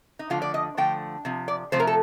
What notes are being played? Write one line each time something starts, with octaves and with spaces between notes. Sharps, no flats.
D#4
D3 F3 A3 F4
D5
D#5
D3 F3 A3 G5
C3 F3
D5
C3 F3 A3 C5
A#4
A4